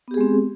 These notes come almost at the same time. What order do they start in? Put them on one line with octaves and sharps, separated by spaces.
B3 G4 G#4 G#3 C4